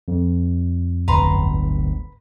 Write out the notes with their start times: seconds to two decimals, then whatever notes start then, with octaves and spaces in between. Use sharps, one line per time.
0.08 F2
1.08 D1 G1 G#2 B4 A#5 C6